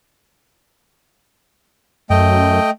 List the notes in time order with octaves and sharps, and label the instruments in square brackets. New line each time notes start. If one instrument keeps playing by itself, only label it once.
[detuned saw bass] F#2 [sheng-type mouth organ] A3 D#5 G5